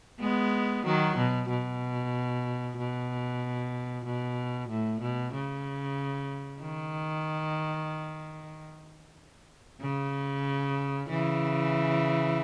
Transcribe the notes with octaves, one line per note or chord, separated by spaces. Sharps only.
G#3 B3
D#3 F#3
B2
B2
B2
B2
A2
B2
C#3
D#3
C#3
C#3 E3